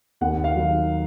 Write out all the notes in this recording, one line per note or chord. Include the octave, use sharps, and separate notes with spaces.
D#2 F#5
F5
D#3 F#3